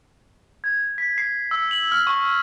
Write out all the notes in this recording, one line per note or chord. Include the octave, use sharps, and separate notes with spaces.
G#6
B6
C7
E6
F#7
F6
C#6